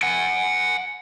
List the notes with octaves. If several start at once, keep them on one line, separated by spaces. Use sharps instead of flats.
F#5 G#5